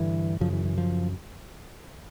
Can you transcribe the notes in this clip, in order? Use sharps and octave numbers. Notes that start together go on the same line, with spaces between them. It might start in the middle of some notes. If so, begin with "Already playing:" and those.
Already playing: G2 D3 E3
F#2 C#3 F3
E3
E3
F3